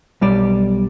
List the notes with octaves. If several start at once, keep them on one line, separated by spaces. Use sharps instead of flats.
B1 G3 D5